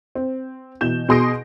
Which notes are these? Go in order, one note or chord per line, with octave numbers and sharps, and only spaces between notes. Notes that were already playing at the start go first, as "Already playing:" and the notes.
C4
B2 E3 G6 E7
B2 G#4 C6 D#6 A#6 D7